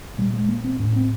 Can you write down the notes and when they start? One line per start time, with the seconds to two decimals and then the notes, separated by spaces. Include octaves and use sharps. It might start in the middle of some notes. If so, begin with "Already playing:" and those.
0.18 A#2 G3
0.33 G#3
0.49 A#3
0.64 C4
0.80 A2 C#4
0.96 C4